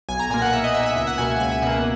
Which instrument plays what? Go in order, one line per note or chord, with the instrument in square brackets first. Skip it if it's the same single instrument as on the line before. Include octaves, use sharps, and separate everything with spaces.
[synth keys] B1 G#5
A#5
A#2 A#3 G#5
F#5
B1 E5
D#5
A#2 A#3 E5
E5
C#2 E5
F#5
B2 A#3 G#5
F#5
C#2 G#5
E5
B2 A#3 F#5